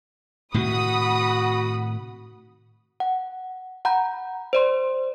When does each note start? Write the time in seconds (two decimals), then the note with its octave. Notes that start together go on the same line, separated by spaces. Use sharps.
0.54 A2 C3 D#3 F#4 F#5 B5 D#6
3.00 F#5
3.85 F#5 A#5 B5 G6
4.53 C5 D5 C6